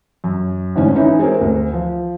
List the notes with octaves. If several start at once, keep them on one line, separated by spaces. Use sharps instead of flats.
F#2
G#1 A2 D3 C#4
E3 C#4 D#4 E4
G#3 C4 C#4 G#4 A#4
D2
F3